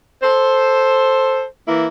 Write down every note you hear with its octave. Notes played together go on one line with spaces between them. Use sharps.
A4 C5
E3 A#3 E4